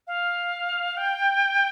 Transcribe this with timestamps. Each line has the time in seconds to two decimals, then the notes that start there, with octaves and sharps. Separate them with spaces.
0.07 F5
0.97 G5